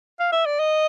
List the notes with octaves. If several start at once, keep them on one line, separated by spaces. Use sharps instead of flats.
F5
E5
D5
D#5